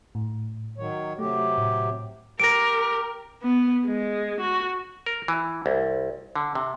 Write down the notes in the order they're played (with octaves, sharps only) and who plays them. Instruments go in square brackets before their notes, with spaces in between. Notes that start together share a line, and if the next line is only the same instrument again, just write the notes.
[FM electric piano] A2
[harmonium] D#3 F#3 C#5
[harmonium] C3 F#3 G4 [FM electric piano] A3
[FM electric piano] A2
[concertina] G4 [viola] A#4 [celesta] A#6 D7
[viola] B3
G#3
F#4
[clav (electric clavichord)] A#4
E3
C2
D3
C3